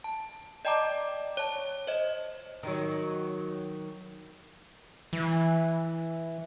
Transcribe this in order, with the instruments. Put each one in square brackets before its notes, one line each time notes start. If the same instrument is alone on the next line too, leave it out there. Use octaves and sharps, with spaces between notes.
[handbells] A5
D5 D#5 G5 A5 A#5 D6
C#5 A5
C5 D#5
[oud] D#3 F#3
[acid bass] E3